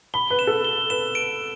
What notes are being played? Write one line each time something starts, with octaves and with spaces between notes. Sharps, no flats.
B5 G7
B4
E7
A4
G7
B4 E7
D7